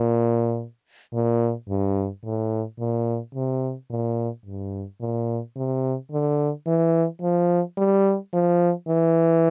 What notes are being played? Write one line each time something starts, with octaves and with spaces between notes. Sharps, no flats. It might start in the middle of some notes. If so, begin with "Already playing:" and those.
Already playing: A#2
A#2
G2
A2
A#2
C3
A#2
G2
A#2
C3
D3
E3
F3
G3
F3
E3